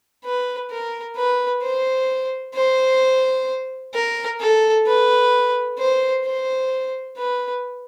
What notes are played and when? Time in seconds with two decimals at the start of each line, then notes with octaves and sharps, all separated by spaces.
0.25 B4
0.71 A#4
1.16 B4
1.62 C5
2.55 C5
3.94 A#4
4.40 A4
4.87 B4
5.78 C5
6.25 C5
7.17 B4